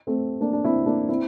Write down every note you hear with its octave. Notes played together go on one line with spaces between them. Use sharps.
A3 C4
A#3 D4
D4
C4 E4
A#3 D4
C4 E4